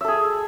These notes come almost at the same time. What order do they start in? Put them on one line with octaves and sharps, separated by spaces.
E5 A4 G#4